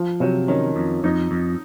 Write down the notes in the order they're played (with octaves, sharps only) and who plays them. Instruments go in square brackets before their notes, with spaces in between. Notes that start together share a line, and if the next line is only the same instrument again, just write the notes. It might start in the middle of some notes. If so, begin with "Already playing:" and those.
Already playing: [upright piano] F3
[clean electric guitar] C3 [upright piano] F#3
[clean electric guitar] D#3 [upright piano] C#4
[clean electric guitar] F2
[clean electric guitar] F2 [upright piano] D#4
[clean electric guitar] F2